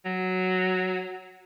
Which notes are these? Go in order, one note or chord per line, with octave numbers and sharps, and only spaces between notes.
F#3